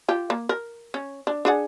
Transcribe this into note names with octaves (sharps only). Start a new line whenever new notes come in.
F4 G4
A#3
A#4
C#4
D4
D4 G#4 F#5